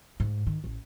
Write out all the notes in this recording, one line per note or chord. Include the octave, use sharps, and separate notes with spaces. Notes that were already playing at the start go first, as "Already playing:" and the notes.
G#2
D#3
A1